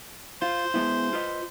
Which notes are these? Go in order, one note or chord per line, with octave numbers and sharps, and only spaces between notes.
F4 C5
G#3 B3 E4
F4 B4 D#5